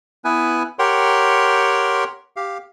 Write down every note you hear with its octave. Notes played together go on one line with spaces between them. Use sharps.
B3 E4 B4 G#5
G4 A#4 C#5 F#5 G5 C6
G4 F5